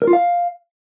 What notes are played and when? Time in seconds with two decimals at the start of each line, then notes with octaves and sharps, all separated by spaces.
0.02 A#4
0.07 F4
0.13 F5